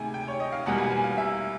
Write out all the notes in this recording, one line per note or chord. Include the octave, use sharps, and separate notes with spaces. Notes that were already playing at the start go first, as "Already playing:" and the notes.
Already playing: D2 C3 D#3 G#3 G#5
G5
C#5
D#5
F5
E2 B2 G3 A#3 F#5
G#5
G#5
F5
E5